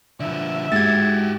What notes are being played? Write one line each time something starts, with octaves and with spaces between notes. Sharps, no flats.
D3 F3 E5
G#2 F#4 G4 G#6 A6